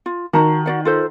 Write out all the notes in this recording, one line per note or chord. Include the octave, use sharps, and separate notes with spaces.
F4
D#3 F#4 A5 A#5
F#4 D5 F#5
F4 A4 C5